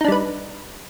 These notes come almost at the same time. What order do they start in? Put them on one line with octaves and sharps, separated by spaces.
D#4 D4 G3 B4